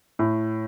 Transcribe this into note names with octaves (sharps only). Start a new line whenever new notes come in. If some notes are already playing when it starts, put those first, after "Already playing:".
A2